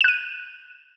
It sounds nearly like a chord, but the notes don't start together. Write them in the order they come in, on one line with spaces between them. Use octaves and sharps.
E7 F#6 D#7